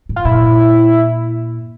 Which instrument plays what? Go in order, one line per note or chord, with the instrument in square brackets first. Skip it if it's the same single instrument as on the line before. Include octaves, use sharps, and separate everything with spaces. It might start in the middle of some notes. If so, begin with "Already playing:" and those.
[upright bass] A2
[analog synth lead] F4
[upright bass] A#2 [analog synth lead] E4